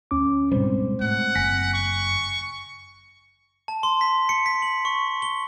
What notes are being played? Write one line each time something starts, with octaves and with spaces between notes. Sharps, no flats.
D2 C#4 D6
G#2 B2 G3 G#3 C4 C5
A2 F#5
F#1 G#5 A#6 B6
C#6
A5
C6
B6
C#7
B6
F#7
C#6
G7